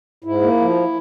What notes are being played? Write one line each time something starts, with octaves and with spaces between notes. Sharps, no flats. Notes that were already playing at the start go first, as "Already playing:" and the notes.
G#2 E4
A#3
F3